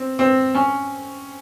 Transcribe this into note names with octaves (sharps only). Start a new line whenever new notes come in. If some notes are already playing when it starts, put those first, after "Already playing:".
Already playing: C4
C4
C#4